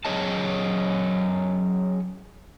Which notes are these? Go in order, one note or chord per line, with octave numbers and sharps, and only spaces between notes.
F#3 C#4 G#4 C#5 D#5 A5